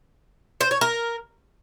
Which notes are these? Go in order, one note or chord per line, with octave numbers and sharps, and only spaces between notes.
C5
C#5
A#4